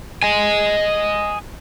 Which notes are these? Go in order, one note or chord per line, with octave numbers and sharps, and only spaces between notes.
D#5 G#5